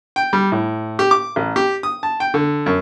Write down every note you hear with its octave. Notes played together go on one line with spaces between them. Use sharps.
G5
G3
A2
G4
D6
A1
G4
D#6
A5
G5
D3
F#2